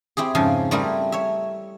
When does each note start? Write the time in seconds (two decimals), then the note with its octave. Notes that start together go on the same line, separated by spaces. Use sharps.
0.17 C4 E4 G4 G#4
0.35 F2 G#2 C#3 F3
0.71 G3 A3 C4 E4 G#4 A#4
1.12 C#5 E5